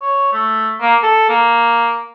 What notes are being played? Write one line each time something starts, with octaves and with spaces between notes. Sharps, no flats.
C#5
A3
A#3
A4
A#3